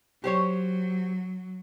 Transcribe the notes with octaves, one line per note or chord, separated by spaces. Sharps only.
F#3 G4 C5 C#5